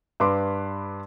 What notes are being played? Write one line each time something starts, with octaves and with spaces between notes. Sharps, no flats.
G2 B4 C6 D6